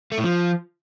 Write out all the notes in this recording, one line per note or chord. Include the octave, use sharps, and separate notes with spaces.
A3
A2
F3